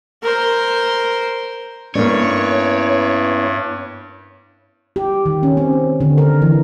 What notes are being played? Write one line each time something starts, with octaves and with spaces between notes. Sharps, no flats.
A#4 C5
G2 A#3 B3 C#4 D4 E4 C#5
G4
D#3
C#4
C4
D3
A#4
E3